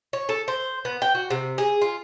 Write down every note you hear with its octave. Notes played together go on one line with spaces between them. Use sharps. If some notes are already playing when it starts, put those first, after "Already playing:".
C#5
A4
C5
B3
G5
F#4
C3
G#4
F4